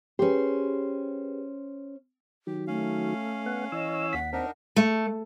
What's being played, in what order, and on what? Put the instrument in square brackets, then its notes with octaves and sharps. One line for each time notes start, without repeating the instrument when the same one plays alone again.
[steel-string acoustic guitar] C#4 C5 [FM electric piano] G4 G#4 B4
[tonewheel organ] D#3 F#3 [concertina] G4
[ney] A3 [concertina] C#4 F5
[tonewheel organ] B3 F#5
[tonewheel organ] E3 C#5 E6 [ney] D#5
[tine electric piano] D#2 B6 [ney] F#5
[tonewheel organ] C4 [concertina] D4 D#4 A#4 [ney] F#5
[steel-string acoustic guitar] A3